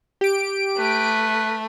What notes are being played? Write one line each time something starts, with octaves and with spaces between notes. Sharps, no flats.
G4 D7
A3 B4